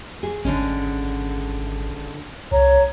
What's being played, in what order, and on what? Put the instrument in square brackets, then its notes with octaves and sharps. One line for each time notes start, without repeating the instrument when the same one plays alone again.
[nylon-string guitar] G#4
[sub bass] G#1 [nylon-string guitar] D3 G#3 C#4
[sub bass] C2 [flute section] C#5 A#5